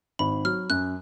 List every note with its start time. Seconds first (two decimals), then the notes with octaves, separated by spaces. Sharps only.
0.19 G#1 B5
0.44 F#3 F6
0.70 F#2 F#6